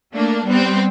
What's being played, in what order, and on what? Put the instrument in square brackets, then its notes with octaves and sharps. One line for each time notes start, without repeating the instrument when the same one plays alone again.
[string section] A3 A#3 D4
G3 B3 C4